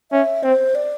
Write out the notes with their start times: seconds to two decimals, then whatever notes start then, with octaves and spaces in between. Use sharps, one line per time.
0.12 C#4 E5
0.43 C4 C5
0.75 D5